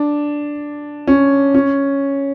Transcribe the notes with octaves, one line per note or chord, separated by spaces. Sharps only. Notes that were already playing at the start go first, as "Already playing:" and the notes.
Already playing: D4
C#4
C#4